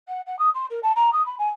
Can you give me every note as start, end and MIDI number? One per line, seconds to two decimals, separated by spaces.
0.08 0.21 78
0.26 0.37 78
0.39 0.49 87
0.54 0.66 84
0.70 0.79 70
0.83 0.92 81
0.96 1.10 82
1.13 1.24 87
1.26 1.35 83
1.38 1.48 80